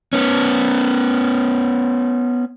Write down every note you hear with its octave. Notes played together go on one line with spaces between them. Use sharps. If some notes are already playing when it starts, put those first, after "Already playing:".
B3 C#4